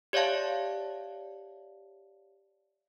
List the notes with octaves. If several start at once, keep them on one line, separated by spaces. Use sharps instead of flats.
G4 C#5 D5 E5 F5 A5